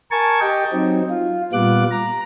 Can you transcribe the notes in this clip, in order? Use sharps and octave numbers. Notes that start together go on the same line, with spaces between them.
A#4 G#5 A5 C#6
G4 D#5 G5
F#3 C4 D#4
F4
A#2 G3 B3 F4 D6 F#6
A#5